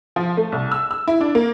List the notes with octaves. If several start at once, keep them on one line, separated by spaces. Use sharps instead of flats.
F3
A3
C2
E6
E6
E4
D4
A#3